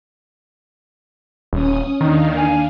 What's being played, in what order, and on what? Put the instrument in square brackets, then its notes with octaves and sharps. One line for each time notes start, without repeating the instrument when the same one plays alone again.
[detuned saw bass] D#1 [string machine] C#4 D#6
[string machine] D#2 D4 F5 [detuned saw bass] D#3 [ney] D#4
[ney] G#5